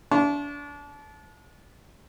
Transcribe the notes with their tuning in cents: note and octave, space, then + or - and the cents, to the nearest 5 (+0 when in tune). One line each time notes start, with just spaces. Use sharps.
D4 -30 E5 +30 C#6 -40